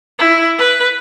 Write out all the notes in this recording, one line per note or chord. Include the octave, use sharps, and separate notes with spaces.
E4
B4